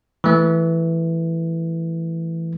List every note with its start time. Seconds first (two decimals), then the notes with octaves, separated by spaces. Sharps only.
0.24 E3 A3